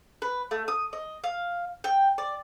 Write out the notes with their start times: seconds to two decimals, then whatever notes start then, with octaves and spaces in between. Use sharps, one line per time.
0.22 B4
0.51 A3
0.68 D#6
0.93 D#5
1.24 F5
1.84 G5
2.18 D5